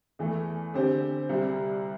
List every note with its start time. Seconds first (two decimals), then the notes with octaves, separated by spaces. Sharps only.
0.19 E2 E3 A3
0.74 D3 C4 G4 C5
1.29 C2 C3 G3